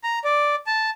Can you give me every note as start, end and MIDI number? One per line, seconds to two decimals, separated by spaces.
0.04 0.19 82
0.24 0.55 74
0.67 0.90 81